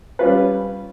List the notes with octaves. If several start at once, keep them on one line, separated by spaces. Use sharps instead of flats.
G3 C#4 F4 B4